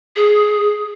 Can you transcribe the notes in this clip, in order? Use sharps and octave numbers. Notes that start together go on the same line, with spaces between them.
G#4